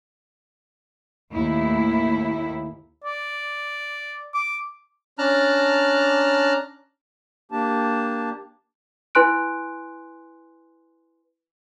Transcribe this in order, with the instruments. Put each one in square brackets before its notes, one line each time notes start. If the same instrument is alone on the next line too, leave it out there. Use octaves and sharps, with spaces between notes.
[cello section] D#2 A2 E4
[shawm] D5
D6
[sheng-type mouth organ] C#4 D4 A5 A#5 F6 F#6
[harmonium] A#3 D4 G4 A5
[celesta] E4 B4 G#5 C6 F#6 D7